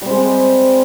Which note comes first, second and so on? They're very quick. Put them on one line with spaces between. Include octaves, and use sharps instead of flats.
G3 C4 G#3